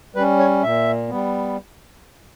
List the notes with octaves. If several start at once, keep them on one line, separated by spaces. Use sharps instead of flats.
G3 C#4 B4
C#5
A#2 E5
G3 B3